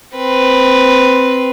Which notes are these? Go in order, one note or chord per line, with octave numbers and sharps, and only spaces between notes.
C4 B4